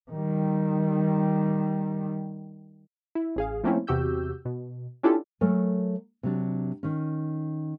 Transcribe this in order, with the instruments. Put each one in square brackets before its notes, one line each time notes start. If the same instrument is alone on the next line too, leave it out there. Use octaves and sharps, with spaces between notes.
[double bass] D#3 G3
[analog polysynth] E4
A1 G#4 F5
F3 A3 A#3 C4 C#4 E4
E2 C3 F#4 G4 E6 G6
B2
C#4 D4 E4 F4 G4 A4
[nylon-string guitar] F#3 A3 A4 A#4 G#5
C3 F#3 D4
D#3 C#4